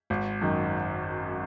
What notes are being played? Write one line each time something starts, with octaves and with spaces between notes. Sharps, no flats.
G#1
F#2 D#3